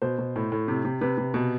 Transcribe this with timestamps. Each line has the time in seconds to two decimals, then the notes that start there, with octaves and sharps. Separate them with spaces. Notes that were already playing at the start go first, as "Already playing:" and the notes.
0.02 B2 C5
0.18 B2
0.36 A2
0.52 A2
0.68 C3
0.85 C3
1.01 C3 B4
1.18 C3
1.34 B2